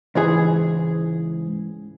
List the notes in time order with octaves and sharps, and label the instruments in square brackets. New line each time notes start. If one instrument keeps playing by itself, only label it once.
[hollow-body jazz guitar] C#2 G#2 E3 G#4